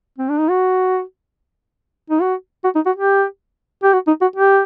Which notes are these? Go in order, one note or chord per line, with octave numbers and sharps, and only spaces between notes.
C4
D4
D#4
F#4
D#4
F#4
F#4
D#4
F#4
G4
G4
F#4
D#4
F#4
G4